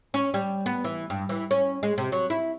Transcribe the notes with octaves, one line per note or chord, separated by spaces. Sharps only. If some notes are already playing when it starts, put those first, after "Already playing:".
C#4
G3
B3
E3
G2
E3
C#4
G#3
C3
F#3
E4